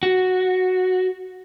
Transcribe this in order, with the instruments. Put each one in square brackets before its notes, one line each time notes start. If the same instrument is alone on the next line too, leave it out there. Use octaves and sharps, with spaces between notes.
[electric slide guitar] F#4